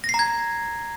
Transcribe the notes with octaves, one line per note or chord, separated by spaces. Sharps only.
A#6
C7
A#5
G#6